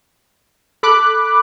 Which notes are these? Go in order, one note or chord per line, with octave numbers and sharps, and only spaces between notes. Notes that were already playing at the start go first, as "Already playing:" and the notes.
A4 B5 D6 F#6